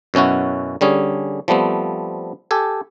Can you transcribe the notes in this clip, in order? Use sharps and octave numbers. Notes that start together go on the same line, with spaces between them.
F#2 B2 C#4 E4 F#4
D3 G3 C#4 G#4
F3 G3 A3 B3 C4
G4 A4 G#5